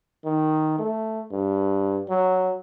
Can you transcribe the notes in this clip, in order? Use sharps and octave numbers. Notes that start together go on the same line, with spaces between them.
D#3
A3
G2
F#3